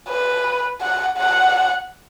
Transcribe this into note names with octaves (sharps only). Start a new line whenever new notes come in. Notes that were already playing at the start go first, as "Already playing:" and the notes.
B4
F#5
F#5